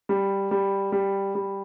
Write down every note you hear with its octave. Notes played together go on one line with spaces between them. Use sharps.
G3
G3
G3
G3